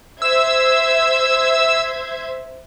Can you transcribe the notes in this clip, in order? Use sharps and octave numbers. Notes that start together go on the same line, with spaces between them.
C5 E5 E6 G#6